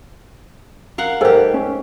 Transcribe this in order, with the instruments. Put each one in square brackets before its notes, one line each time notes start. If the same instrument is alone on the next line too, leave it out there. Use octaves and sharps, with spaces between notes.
[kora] A#4 F5 F#5
[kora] G#2 G4 [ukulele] A4 A#4 G5
[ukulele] C#4